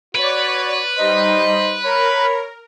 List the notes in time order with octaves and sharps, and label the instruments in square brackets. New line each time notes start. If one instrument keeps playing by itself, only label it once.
[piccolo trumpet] F#4 [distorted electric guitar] B4 [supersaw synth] C#5 D5
[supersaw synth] G3 D#4 [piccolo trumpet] C5 [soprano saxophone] D#5
[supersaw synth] A#4 [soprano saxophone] C#5 [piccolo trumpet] B5